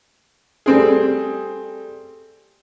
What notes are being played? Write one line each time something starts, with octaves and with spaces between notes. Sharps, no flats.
G3 A3 C4 G#4